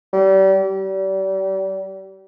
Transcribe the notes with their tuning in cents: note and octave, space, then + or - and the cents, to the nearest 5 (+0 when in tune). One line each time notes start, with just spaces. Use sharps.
G3 -30
G3 -35